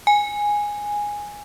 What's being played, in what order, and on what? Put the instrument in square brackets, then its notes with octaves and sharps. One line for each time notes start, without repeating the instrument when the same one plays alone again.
[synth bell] G#5